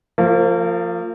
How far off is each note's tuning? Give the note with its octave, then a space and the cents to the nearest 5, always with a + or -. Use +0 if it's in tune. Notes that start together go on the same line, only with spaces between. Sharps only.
F3 +0 A#3 -35